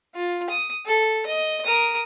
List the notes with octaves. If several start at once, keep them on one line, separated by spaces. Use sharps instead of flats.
F4
D#6
A4
D#5
A#4 D#6